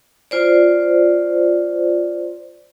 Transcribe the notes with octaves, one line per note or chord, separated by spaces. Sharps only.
F4 C5 D5